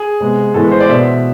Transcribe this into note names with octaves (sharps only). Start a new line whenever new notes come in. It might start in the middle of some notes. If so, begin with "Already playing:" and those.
Already playing: G#4
C3 G#3 B3
A2 E3 G#3 B3 A4
B4
C5
D5
B2 B3 E5